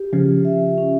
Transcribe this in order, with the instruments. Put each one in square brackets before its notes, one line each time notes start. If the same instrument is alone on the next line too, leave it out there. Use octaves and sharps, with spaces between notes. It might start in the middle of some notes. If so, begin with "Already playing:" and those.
Already playing: [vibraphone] G4
[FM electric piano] C#3 F3 [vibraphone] F4
[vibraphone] E5
C#4